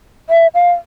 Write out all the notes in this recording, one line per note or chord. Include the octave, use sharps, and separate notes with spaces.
E5
F5